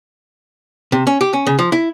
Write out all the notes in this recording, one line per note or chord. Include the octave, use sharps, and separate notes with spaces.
C3
C#4
G4
C#4
C#3
F3
E4